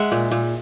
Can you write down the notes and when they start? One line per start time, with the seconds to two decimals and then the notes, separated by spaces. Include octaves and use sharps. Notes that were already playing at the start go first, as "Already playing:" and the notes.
Already playing: G#3 E5 F#5
0.12 A#2
0.31 A#2